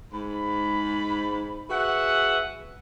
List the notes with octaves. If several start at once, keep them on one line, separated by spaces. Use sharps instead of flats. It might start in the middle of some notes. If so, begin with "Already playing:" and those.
G#2 B5
F#4 G#4 B4 E5 F#5